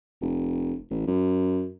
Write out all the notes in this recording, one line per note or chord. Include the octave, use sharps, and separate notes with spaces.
F1
A1
F#2